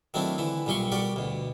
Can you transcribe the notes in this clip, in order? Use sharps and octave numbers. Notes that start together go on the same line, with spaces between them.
D#3 F#3 A3 C4 D4 E4
D3 E3 E4
B1 A#2 G3 G4 C6 C#6
G3 F#4 G4 A#4 D5
D2 B2